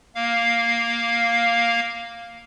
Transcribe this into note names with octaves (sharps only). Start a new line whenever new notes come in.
A#3 F5